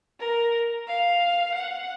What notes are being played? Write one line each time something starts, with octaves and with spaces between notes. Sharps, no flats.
A#4
F5
F#5